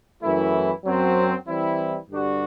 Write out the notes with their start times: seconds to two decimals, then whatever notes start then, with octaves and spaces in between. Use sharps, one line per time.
0.22 F#2 E3 A3 E4
0.85 F#2 F#3 C4
1.47 E3 G3 C4 E4
2.10 G2 D3 G3 D4 F#4